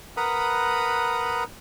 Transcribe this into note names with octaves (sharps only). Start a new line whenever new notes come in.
A#4 B4 F#5 A#5 B5 D#6